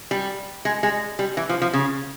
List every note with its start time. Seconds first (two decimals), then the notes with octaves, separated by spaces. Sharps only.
0.11 G3
0.65 G#3
0.83 G#3
1.19 G3
1.37 E3
1.49 F3
1.62 F3
1.73 C#3